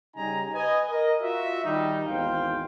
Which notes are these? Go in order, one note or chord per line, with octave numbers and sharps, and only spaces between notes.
C#3 G3 D#4 G#5 A#5
B4 D#5 G#5
A#4 D#5
F4 F#4 E5
D#3 G3 D#4
G#1 E2 G#2 C5 F5 G5